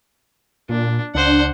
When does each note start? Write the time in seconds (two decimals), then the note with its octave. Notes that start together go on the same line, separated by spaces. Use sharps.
0.69 A#2 D4
1.15 C#2 D4 C5 F#5